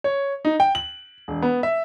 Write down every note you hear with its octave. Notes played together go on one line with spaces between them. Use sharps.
C#5
D#4
G5
F#7
E1
B3
E5